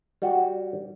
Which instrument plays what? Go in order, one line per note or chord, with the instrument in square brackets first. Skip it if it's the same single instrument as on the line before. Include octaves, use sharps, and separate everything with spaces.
[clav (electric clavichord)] G3 F#4